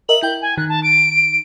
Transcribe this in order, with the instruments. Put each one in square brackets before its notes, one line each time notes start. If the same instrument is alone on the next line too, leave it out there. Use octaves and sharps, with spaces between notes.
[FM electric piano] A#4 D#5 E5 [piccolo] F#7
[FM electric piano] E4 G5 [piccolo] G6
[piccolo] G#5
[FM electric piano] D#3 [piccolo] F#6
[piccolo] A5
D7